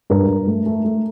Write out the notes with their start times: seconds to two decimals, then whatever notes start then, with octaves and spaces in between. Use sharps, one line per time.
0.10 G2 A#4
0.28 G2
0.47 A3
0.66 A3
0.85 A3